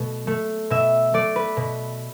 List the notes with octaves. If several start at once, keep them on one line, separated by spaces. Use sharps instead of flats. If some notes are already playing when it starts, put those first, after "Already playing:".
Already playing: B2 A3
A3
B2 E5
A3 D5
B4
B2